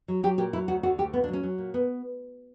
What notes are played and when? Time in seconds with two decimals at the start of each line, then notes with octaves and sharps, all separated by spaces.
0.08 F#3
0.23 F#3 G4
0.38 A#2 G4
0.53 F#3 E4
0.68 D2 F#4
0.83 D3 F#4
0.98 D2 G4
1.13 A#2 B3
1.24 D4
1.28 F#3
1.33 C#4
1.43 F#3
1.58 A#2
1.74 B3